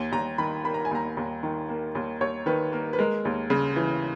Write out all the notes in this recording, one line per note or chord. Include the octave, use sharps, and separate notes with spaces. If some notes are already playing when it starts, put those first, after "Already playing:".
Already playing: D#2
D#2 A#5
D#3 B5
A#3 B5
A#5
G#5
D#2 A#5
D#2
D#3
A#3
D#2
D#2 C#5
D#3 B4
A#3 A#4
B4
G#3 A#4
D#2
C#3
E3